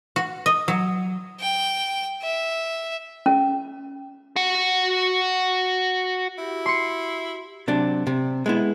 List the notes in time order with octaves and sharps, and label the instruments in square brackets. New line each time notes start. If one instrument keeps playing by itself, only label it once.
[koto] F#4
D#5
F#3
[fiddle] G5
E5
[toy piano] C#4
[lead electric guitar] F#4 F#5
[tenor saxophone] E4 [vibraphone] F#4 G4
[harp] C6 C#7
[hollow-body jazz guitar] C3 F#3 D4
C3
G#3 B3 E4